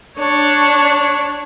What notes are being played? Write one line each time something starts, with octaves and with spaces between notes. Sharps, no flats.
D4 C#5